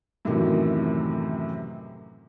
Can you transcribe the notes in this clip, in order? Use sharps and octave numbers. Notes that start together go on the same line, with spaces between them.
F#2 A2 C3 D#3 E3 F#3